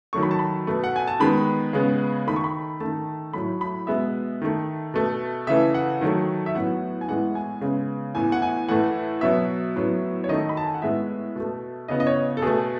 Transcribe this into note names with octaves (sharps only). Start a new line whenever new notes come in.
D#3 F#3 A3 C#6
B5
A5
B5
B2 A3
F#5
G#5
A5
D#3 G#3 B3 B5
C#3 G#3 B3
D#3 A3 B5
C#6
B5
D#3 A3 A5
A2 F#3 A3 B5
B5
B2 G#3 B3 E5
D#3 A3
B2 A3
C#3 E3 A3 E5
F#5
D#3 F#3 A3
E5
A2 F#3 B3 F#5
G#5
A2 E3 G#3 B3 F#5
G#5
C#3 G#3 B3
A2 E3 B3 G#5
F#5
G#5
A2 E3 A3 F#5
B2 F#3 B3 E5
A2 F#3 B3
C#5
D#3 A3 D#5
B5
A5
G#5
F#5
A2 G#3 B3 E5
B2 A3
C#3 E3 B3 D#5
D#5
C#5
A4
B2 A3 G#4